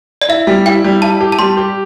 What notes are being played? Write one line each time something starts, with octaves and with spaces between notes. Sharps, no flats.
D5
E4 E5
G3
E4 G5
G3
E4 A5
G4
A5
G3 C6
G4